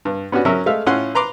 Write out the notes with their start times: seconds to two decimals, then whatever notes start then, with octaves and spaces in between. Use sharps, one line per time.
0.05 G2
0.32 B3 C#4 D4 F#4
0.45 F#3 C#4 A#4 E5
0.66 G#3 A3 E5 F5
0.86 A2 C#4 F4 F#5 C6
1.15 B4 A#5 C6 D6